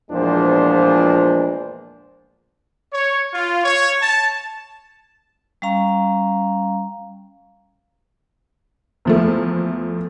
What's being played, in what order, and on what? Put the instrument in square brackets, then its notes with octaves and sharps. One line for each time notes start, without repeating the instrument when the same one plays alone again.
[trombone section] E2 A#2 F3 G#3 D4 C5
[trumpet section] C#5
F4
C#5
A5
[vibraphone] G3 C#4 F5 A#5
[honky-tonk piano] E2 F3 A3